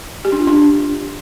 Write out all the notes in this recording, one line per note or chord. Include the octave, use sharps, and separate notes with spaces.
G4
D4
F4
D4